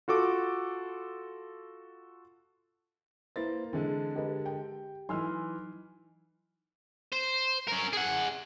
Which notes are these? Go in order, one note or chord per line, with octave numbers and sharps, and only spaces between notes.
F4 F#4 A4 D6
A#3 E4 B4 C5 A6
D3 E3 G#3 C4 G#4
G4 A#4 B4 D#5
G5
E3 F#3 D#4 G#5 C6 E6 F6
C5
C#4 A#4
G#4 F#5